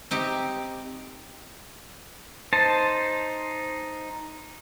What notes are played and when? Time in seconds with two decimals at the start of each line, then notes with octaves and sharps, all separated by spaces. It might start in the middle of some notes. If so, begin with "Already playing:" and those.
0.11 C4 D#4 G4
2.53 D#4 C5 A5